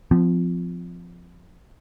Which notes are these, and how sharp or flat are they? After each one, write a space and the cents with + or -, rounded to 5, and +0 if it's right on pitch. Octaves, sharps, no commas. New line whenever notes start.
F3 +0 C4 -30